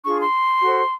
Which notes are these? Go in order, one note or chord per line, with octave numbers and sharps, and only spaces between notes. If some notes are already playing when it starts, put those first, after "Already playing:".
D4 F4 G#4 C#6
C6
F#4 A4 C5